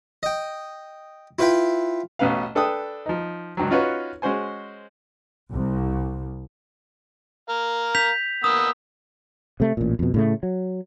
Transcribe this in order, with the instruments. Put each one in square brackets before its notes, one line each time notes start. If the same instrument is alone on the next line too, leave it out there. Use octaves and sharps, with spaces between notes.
[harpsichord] D#5 G5
E4 F4 B4 E5 G5 B5
[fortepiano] A1 B2 C#4 B4 F5
D4 A4 B4 G5 D#6
F3 D#4
C#2 G2 F#3
C#4 D#4 F4 F#4 B4 C#5
G#3 C#4 F#4 C5 G#5
[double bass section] C2
[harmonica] A#4 F5
[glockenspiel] G6 B6 F7
[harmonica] A#3 B3 E6 [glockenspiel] D#6
[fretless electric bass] C3 A3
A1 A#2
F2 B2
A2 C#3 A3
F#3